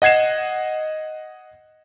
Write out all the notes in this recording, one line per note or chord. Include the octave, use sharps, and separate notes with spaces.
D#5 F#5 G#6 C7 E7